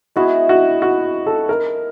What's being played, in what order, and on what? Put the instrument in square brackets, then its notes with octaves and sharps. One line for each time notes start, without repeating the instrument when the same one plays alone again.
[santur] G#3 B3 E4 G#4 [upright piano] F#4
[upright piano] F#4
F#4
A4
A#4